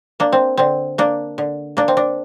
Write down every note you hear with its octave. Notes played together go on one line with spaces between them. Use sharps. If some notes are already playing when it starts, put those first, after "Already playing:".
A#3 D4
C4
D3 C4
A#3 D4
D3
A#3 D4
C4
D4